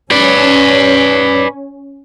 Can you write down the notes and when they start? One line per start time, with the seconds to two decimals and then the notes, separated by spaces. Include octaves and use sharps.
0.11 C#4 B4 D5